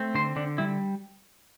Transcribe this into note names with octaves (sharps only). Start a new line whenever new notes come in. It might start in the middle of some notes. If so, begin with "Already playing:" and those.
Already playing: A3 C4
D3 C5
D3 D4
G3 E4